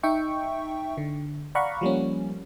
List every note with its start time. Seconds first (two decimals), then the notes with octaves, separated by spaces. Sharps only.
0.03 D#4 E5 G5 C#6
0.97 D3
1.55 D5 F5 F#5 A#5 B5 C#6
1.81 F3 G3 A#3 C#4